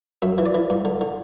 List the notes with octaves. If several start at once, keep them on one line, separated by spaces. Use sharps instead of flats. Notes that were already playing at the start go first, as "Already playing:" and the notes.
F#2 E5
E3
D5
E3
G2
D3
D3